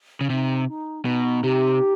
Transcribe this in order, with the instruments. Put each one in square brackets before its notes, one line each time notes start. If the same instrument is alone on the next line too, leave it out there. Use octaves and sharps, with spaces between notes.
[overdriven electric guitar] C#3
[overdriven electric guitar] C3 [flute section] D#4
[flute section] D#4
[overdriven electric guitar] B2 [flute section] D#4
[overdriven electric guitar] C3 [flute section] G4